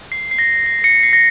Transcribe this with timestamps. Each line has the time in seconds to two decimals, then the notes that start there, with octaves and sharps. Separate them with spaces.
0.12 C7
0.31 C7
0.39 A#6
0.66 C7
0.84 A#6 C#7
1.03 C7
1.13 A#6